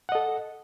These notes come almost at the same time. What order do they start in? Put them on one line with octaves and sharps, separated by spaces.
F#5 D#5 A4